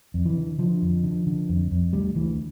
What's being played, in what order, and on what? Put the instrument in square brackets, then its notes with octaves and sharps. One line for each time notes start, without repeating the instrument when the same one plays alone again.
[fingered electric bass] F2
E3
D3
D3 F3
F2
D3
D3
F2
F2
D2 G3
D2 E3